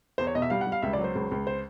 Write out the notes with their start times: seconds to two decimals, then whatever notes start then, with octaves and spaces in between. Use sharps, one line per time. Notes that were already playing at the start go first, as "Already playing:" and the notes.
0.18 E2 C5
0.27 C#5
0.35 B2 D#5
0.42 E5
0.50 G3 F5
0.61 F#5
0.67 G3
0.72 F5
0.82 C#2 E5
0.93 D5
0.98 F#3
1.04 C5
1.15 C#2
1.31 C#2
1.47 C5